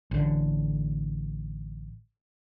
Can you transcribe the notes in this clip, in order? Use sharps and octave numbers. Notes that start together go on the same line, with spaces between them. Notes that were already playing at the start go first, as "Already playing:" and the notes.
A1 D3